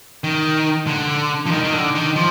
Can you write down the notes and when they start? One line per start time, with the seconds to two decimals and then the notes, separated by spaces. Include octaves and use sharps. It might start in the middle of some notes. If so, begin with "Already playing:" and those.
0.24 D#3
0.87 D3
1.46 F3
1.51 D#3
1.64 D#3
1.73 D3
1.95 D#3
2.16 F3